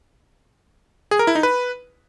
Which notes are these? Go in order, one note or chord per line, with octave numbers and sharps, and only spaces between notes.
G#4
A#4
E4
D#4
B4